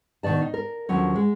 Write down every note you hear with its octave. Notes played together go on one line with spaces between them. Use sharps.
B2 D#3 F3 D5 A5
D#4
A#4
D#2 D3 F3 F#3 C#4
G#3